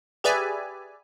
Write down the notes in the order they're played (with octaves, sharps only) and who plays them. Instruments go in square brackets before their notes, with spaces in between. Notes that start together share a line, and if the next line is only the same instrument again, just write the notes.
[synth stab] G4 G#4 B4 D5 E5 G#5